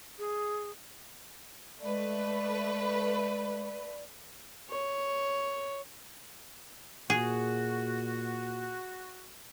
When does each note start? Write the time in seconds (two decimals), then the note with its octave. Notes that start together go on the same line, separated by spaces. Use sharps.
0.19 G#4
1.80 G#3 A3 B4 D5
4.70 C#5
7.10 A#2 F#4 G#4